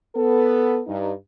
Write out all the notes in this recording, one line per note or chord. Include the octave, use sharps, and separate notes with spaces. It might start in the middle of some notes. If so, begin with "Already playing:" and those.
B3 A4
G2 D#4